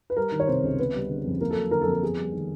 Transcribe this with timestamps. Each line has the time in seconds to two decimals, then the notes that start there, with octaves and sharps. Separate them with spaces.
0.10 B4
0.17 G3 A#4
0.32 D#3
0.40 C#5
0.47 C3 C5
0.63 C#2
0.79 B3 B4
0.95 G3
1.09 D3
1.26 F2
1.41 A#3 A#4
1.51 A4
1.56 F#3
1.71 D3 A#4
1.81 A4
1.87 F2
1.93 A4
2.03 B3 G#4
2.18 G3
2.33 D#3